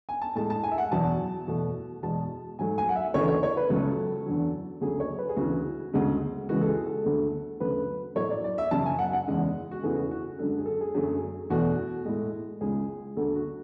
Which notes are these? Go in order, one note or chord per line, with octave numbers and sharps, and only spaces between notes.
G#5
A5
A2 G#3 A5
A5
G#5
E5
F#5
E2 B2 F#3 A5
E2 B2 A3
E2 B2 G#3 A5
G#2 F#3 A3 G#5
G#5
F#5
E5
D2 C#3 E3 A3 C#5
C#5
C#5
B4
C#2 C#3 F#3 A3 A4
E2 D3 F#3
D2 C#3 F#3 A3 G#4
C#5
B4
G#4
D2 C#3 E3 F#4
D2 C#3 G#3
C#2 C#3 E3 G#3 F#4
A4
G#4
A4
D2 D3 A3
D2 C#3 F#3 A3 B4
A2 F#3 A3 C#5
D5
D5
E5
F#2 C#3 F#3 A5
G#5
F#5
F#5
E2 C#3 G#3
F#4
E2 C#3 E3 A3 G#4
F#4
F#4
F#2 D3 G#3 A4
G#4
A4
G#4
F#2 D3 F#3 A3 G#4
E2 B2 A3 F#4
A2 G#3
C#2 C#3 G#3 G#4
D2 D3 A3 A4
F#4